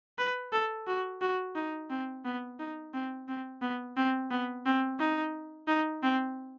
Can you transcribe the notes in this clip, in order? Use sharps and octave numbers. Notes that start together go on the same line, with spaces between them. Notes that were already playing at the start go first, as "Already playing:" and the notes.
B4
A4
F#4
F#4
D#4
C4
B3
D#4
C4
C4
B3
C4
B3
C4
D#4
D#4
C4